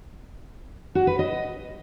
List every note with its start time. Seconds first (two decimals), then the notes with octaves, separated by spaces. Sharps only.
0.95 F#4
1.07 B4
1.19 D#5